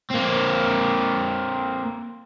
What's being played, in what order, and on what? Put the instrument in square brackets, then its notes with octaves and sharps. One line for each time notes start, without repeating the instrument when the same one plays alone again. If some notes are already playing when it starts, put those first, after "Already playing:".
[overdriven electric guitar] A#3 C4